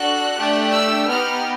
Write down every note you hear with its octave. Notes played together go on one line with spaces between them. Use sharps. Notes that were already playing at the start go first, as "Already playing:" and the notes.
Already playing: D4 F#4 A4 F#6
A3 D4 G4
E6
B3 D#4 G4 F6